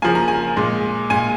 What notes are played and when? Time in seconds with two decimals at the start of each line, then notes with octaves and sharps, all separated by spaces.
0.02 C#3 F3 A#3 G#5
0.15 A#5
0.28 G#5
0.56 A#2 G#3
1.10 A#2 G#3 G#5